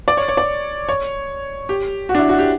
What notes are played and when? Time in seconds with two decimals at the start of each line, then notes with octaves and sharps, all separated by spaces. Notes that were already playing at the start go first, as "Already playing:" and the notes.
0.08 D5
0.17 C#5
0.28 C#5
0.37 D5
0.89 C#5
1.69 G4
2.09 F#4
2.15 D4
2.19 E4
2.29 F#4
2.39 G4